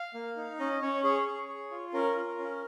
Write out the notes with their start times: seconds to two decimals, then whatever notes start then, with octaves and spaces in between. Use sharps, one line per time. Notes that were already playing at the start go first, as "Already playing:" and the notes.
Already playing: F5
0.14 A#3
0.36 D#4
0.59 C#4 D#5
0.82 C#4 C#5
1.04 G#4 C#5
1.26 G#4
1.48 G#4
1.71 F4
1.93 C#4 A#4
2.16 F4
2.38 C#4